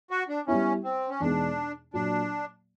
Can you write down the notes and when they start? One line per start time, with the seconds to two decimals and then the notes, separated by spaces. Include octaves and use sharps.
0.11 F#4
0.29 D4
0.47 G3 B3 C#4 E4
0.84 C4
1.10 C#4
1.20 E2 B2 G#3 B3 D4 D#4
1.94 A#2 F#3 A#3 D4